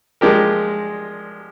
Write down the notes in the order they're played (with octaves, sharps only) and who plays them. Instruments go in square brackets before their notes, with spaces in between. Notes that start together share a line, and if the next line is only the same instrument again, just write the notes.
[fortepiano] F3 G#3 D4 G4 A#4